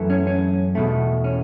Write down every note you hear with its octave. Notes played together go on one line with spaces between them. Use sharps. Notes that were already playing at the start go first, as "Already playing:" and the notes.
Already playing: F#2 E3 A3
C#4
C#4
E2 B2 A3
C#4